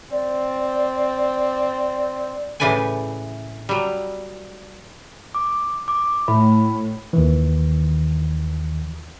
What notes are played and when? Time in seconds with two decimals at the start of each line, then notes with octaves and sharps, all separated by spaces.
0.12 C4 D5
2.60 A2 C#3 E3 B4 D5 G#5
3.69 F#3 G3
5.35 D6
5.88 D6
6.28 A2 B5
7.13 D#2 D#3 E3